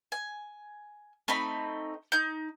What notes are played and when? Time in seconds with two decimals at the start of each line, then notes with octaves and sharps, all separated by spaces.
0.12 G#5
1.28 A3 C4 D#4 B5
2.12 D#4 G6